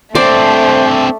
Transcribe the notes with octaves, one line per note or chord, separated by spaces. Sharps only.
A3 C4 D4 C5 D5